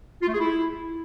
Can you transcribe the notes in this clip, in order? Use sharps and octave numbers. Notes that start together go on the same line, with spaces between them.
F4
A3
G#4
E4